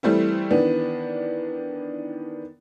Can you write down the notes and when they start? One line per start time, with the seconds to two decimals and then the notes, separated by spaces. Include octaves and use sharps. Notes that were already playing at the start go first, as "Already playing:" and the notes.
0.03 E3 G3 A3 C4 E4
0.51 D#3 E3 B3 D4